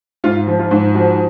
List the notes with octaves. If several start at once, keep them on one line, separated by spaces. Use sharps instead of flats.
G#2 F4
F3
F4
G#2
F3 F#4